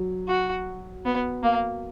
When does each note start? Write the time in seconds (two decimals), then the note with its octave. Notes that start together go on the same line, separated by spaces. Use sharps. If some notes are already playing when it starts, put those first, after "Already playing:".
Already playing: F#3
0.28 F#4
1.05 B3
1.43 A#3